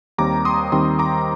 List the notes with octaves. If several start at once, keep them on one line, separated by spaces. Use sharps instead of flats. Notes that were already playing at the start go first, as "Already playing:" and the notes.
D#2 D#3 G3 C4 A#5 D6
C6 D#6
D#2 D#3 G3 C4 C6 D#6
A#5 D6